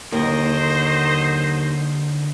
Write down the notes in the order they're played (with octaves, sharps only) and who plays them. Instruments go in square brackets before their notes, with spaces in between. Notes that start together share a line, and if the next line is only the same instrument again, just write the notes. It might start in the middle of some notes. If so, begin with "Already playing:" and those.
[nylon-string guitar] D#2 [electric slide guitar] D3 A#4 [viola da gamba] F#3 D#5 [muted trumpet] C5